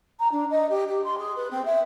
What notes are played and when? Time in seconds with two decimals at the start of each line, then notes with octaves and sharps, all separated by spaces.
0.19 A#5
0.31 D4
0.50 D#5
0.69 G4
0.88 G4
1.04 C6
1.18 G#4
1.36 B4
1.51 C4
1.65 E5